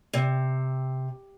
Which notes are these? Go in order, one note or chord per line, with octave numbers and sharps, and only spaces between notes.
C3